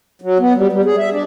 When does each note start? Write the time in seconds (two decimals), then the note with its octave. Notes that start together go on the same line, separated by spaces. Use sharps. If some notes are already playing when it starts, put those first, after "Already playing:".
0.22 F#3
0.39 B3
0.56 G3
0.72 G3
0.85 G#4
0.98 E5
1.12 D4